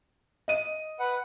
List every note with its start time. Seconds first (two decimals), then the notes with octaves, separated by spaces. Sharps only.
0.48 D#5 D#7
0.99 B4 F#5